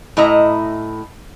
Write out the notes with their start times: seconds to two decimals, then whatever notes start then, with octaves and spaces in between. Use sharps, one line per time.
0.17 A2 E4 D#5 A#5